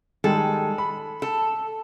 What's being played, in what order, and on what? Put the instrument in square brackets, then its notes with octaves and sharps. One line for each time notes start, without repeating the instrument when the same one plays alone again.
[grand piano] D#3 G3 G#3 [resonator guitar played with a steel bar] A4
[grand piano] B5
[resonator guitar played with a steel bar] A4